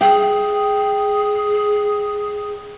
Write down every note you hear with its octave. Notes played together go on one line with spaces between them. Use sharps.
G#4 G5